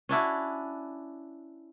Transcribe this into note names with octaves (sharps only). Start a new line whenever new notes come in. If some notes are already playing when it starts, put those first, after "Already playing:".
C#4 D4 E4 F#4